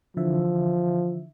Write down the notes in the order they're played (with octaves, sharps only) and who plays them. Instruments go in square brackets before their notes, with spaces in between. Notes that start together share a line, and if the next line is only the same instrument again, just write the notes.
[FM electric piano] D3 E3 E5 [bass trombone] F3